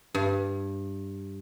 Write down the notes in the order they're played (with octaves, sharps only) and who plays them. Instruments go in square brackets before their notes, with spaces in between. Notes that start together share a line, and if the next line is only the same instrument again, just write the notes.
[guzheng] G2